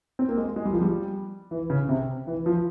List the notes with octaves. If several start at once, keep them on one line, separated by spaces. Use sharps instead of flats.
C4
A#3
G#3
G#3
G3
F3
G3
E3
C#3
C3
E3
F3